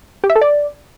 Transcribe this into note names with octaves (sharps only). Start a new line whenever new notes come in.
G4
E5
A4
D5